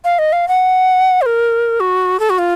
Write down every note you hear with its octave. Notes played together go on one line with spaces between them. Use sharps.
F5
D#5
F5
F#5
C5
A#4
F#4
A4
F#4
F4